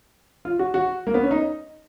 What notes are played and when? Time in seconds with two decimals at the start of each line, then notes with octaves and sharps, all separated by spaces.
0.45 F4
0.59 F#4
0.74 F#4
1.07 A#3
1.14 B3
1.23 C#4
1.31 D#4